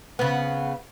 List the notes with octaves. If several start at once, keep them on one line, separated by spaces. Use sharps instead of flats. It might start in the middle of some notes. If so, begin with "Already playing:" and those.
C#3 B3